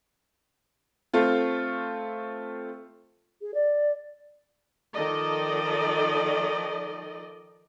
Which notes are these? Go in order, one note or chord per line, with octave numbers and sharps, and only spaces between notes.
A3 C4 F4
G#4
D5
D#3 F3 A4 D5 D#5